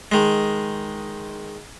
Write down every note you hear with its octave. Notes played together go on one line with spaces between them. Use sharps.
D#3 G#3